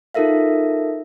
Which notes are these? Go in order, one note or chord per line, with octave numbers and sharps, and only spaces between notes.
D#4 F4 A4 A#4 E5 F5